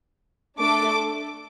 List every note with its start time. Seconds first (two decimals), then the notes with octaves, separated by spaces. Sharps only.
0.58 A3 D4 A4 D6